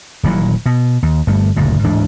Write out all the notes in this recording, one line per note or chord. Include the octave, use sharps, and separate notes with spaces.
D#1 A#2 E3 F#3
B2
D#2
G1 G2 A3
F#1 D2 G2 A#2
D1 G#2 E3 D4